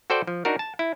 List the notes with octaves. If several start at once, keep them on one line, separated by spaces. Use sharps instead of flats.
F#4 A4 C5 D5 G5
F3
D4 D#4 F#4 A#4
A5
E4